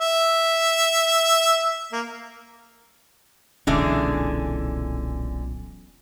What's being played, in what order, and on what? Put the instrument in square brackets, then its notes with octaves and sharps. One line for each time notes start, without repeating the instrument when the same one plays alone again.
[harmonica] E5
A#3
[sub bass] D#1 [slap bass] B1 A#2 C#4 [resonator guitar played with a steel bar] D3 E3 G#3